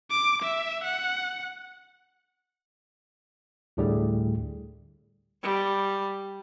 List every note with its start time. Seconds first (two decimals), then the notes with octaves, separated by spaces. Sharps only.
0.11 D6
0.43 E5
0.84 F#5
3.77 D2 A2 D3 G3 A3 G#4
5.43 G3